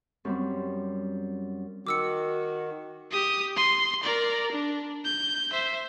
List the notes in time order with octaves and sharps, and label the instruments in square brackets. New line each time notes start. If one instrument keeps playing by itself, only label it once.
[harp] F#2 G3 C4
[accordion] D#3 [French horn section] F#4 [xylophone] D6 E6 C#7
[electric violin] G4 D#6
C6
A#4 D5
D4
G6
C5 E5